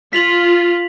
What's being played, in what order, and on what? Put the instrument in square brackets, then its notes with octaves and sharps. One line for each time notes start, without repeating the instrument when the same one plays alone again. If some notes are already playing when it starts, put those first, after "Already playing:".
[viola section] F4 [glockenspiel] B6 F7 F#7